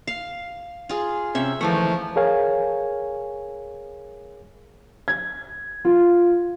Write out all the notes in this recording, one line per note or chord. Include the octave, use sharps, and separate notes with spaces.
F5
F4 G#4
C3 C#4 E5
D#2 E3 F3 A3
G#4 A#4 C#5 F5 G#5
G#6
F4